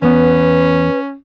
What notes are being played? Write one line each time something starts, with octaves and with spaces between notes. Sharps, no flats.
E2 B3 C#4 B4